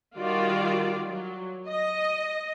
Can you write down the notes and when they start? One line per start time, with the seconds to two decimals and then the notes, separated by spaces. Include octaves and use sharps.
0.16 D#3 G3 F4 F#4 D5
1.09 F#3
1.67 D#5